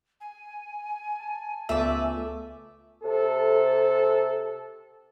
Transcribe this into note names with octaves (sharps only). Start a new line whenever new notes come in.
G#5
A5
C#2 A3 B3 F4 D5 E5
C3 A4